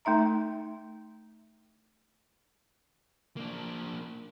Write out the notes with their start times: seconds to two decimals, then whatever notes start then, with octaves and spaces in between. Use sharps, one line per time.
0.05 A3 D#4 E5 A#5
3.37 A#3 D4